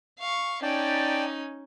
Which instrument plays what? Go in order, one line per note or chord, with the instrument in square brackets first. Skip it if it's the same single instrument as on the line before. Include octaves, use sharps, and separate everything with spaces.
[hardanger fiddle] F5 C#6
[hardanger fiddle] C#4 D#4 [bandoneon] D5 G5 A5